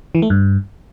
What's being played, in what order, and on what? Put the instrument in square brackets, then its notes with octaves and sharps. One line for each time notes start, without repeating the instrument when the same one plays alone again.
[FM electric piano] E3
A3
G2